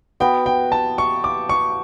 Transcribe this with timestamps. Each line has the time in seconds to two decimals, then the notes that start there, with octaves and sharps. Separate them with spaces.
0.20 B3 F#4 B4 G5
0.46 G5
0.72 A5
0.98 C#6
1.24 D6
1.49 C#6